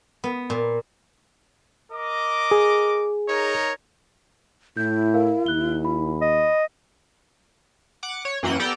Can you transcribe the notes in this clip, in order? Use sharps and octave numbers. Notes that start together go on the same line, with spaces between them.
B3
A#2
A#4 D#5 D6
G#4
D#4 A#4 C#5
A2 E4 G6
A#4 F5
D#2 F#6 G7
B5
D#5
F#5 D6
C#5
F#2 E3 A#3 F#5 G5 D#7
B3 G4 A4 D5 G5 A#5